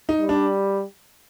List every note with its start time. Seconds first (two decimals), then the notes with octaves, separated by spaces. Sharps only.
0.09 D#4
0.19 G3
0.29 D4